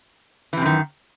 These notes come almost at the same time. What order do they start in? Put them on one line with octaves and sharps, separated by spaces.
E3 C3 F#2 D#3